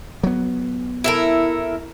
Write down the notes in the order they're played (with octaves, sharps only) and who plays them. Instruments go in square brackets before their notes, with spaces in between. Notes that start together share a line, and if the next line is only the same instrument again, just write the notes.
[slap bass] F#3 B3
[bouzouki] E4 A4 A#4